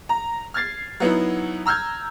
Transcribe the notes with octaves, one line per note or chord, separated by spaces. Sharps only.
A#5
F6 G#6 A6 C7
F#3 B3 D#4 E4
A#5 E6 F6 G6 G#6